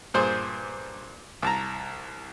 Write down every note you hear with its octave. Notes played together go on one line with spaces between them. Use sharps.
G2 A#2 G#4 C5 C6
C2 A5 A#5